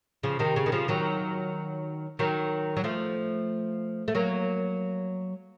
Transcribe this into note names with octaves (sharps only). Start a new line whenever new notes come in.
C#3 F3
C3 D#3
C#3
D#3
C#3 F3
D#3 F#3
D#3 F#3
F#3
F3 A3
A3
F#3 A#3